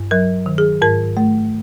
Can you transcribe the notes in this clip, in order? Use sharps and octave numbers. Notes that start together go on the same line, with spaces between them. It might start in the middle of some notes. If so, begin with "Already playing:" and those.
Already playing: G2
F#3 A#4
D#3
G#4
G#2 A#4
A3